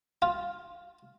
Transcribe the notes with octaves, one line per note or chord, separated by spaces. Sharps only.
F4